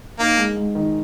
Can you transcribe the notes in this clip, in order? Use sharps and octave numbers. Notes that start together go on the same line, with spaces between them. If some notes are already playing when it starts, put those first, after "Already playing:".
A#3 D#4
G#3
G#2
D#3